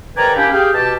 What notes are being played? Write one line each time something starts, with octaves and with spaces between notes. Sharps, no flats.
G#2 D#3 B4 D5 G#5 A#5
A#3 C#4 D4 E4 G4
G4 G#4 F5 G5
B2 G4 A5